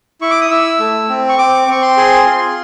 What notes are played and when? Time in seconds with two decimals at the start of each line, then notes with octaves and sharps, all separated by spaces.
0.21 E4 C#6
0.31 D6
0.41 D#6
0.50 E4 E6
0.79 A3
1.09 C4
1.29 C#6
1.38 C4 D6
1.68 C4 C#6
1.82 C6
1.97 G#4
2.26 F4